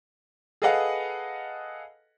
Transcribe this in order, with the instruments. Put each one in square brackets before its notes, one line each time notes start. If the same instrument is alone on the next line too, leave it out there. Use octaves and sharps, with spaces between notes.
[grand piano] G#4 A4 B4 D#5 F5 F#5